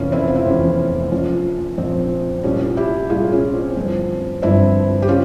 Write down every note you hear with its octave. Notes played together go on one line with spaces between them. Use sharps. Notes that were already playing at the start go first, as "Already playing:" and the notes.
Already playing: F1 E2 C3 C#4 F4
C4 E4
F4
E4
F1 E2 C3 C#4
A#1 A#2 F3 C#4
A#1 A#2 F3 C4
C2 A#2 G3 C#4
E4 G4
C2 A#2 G3 F4 G#4
C#4 F4
C4
G1 G2 F3 C4
G1 G2 F3 C4 E4
G4
C#3 C#4 F4